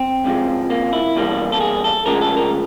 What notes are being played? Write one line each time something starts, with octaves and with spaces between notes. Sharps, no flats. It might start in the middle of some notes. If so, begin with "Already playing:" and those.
Already playing: C4
C#2 C3 F3 G#3
A#3
E4
E2 B2 G3 A#3
A4
G#4
A4
D2 C#3 F3 G#3 A#4
A4
A#4